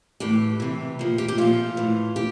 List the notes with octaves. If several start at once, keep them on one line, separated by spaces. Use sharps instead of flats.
A2 E3 G4
C3 E3
A#2 F3
G4
G4
A#2 F3 F4
A2 E3
G4